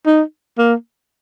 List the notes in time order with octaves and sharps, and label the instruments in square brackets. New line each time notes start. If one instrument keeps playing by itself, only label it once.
[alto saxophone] D#4
A#3